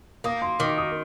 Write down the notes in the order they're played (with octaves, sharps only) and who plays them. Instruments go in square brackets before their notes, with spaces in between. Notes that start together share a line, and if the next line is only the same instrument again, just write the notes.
[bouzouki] A#3 [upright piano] D#6
[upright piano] C6
[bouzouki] D#3 [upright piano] D6
[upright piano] D#6